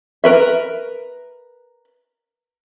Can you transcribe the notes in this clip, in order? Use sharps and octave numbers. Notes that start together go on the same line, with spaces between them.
A#4 B4 E5